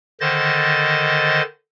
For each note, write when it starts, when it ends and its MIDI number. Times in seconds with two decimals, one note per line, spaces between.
0.21 1.42 50
0.21 1.42 51
0.21 1.42 72
0.21 1.42 75
0.21 1.42 93